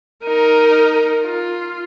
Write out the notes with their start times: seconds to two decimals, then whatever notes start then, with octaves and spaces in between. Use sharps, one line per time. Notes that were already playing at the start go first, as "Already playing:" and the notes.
0.24 D#4 A#4
1.22 F4